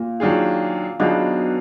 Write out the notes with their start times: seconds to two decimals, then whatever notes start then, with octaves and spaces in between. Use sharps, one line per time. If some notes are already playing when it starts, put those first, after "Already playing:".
Already playing: A#2
0.20 D#3 F#3 D4 F4 G#4
0.99 B2 D#3 F#3 D4 F4 G#4